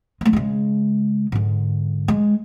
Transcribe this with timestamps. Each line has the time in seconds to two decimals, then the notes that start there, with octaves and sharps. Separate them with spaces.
0.21 G#3 A3
0.33 C#3 G#3
1.32 G#2 D3
2.08 G#3